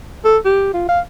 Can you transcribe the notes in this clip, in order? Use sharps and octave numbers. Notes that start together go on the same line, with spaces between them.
A4
G4
F4
F5